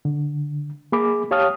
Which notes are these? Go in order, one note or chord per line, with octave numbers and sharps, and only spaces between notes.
D3
A#3 G#4 B5 D6
G4 C#5 F5 A5 D#6 F6